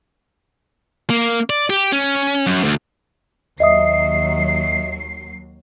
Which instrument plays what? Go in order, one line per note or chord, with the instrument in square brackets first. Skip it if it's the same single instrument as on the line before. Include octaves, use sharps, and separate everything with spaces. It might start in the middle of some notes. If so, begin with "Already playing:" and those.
[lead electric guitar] A#3
D5
G4
C#4
F#2
D2
[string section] D#2 F#3 C7 [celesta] D#5 E5 D#6